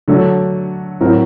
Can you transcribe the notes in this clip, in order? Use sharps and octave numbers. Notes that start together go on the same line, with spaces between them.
D3 F#3 A3 D4
A2 F#3 C4 F#4 A#4